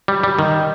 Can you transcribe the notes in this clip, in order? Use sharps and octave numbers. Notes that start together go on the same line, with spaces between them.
G3
G3
D#3